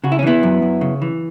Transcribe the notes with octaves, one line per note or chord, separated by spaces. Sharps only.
C#3 F#4
E4
C#4
E3 B3 E4
F#2
F#2
C#3
E3